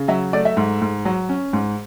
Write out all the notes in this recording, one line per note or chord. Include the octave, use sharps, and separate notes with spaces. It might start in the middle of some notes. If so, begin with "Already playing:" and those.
Already playing: C#3
F#3 E5
A3 D5
E5
G#2
G#2
F#3
C#4
G#2